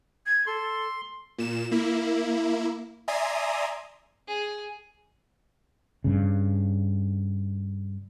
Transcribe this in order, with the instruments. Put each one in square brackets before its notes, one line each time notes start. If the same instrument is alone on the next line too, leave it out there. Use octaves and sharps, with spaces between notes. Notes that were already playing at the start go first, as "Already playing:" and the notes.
[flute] G#6
[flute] A4 [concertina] C6
[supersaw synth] A#2 E7
A#3 E4
D5 E5 G#5 A#5 C6 D#6
[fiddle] G#4
[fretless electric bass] G2 C#3